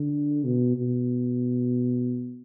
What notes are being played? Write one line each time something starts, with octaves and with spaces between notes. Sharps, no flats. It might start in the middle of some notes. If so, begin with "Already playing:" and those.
Already playing: D3
B2
B2